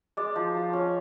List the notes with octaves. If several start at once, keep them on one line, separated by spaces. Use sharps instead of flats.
G#3 D5
F3
F3
C#4